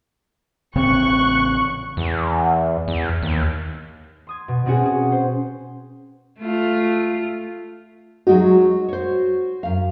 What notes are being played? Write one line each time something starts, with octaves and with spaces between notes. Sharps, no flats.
A1 C#3 C4 C#6 F#6
E2
E2
D#2
C6 D#6 G#6
B2
B2 C4 C#4 F#4 G#4
G#4
C5
A3 F4
F#3 G#3 D#4 F#4
C5 C#5
F#2 F5